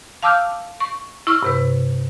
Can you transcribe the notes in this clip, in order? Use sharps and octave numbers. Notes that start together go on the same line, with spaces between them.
F5 A5 D6 E6 F6 G6
C#6
E4 C#6 E6 F6
G2 C3 B4